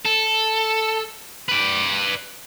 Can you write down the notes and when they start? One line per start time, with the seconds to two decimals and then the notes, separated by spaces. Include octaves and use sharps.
0.05 A4
1.49 B4 D5